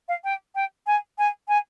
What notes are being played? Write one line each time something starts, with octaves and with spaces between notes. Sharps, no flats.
F5
G5
G5
G#5
G#5
G#5